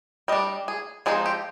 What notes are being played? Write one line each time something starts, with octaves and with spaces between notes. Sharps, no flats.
G3 D4 D#5
G#4
F3 G#3 C4 D#4 G#4
G4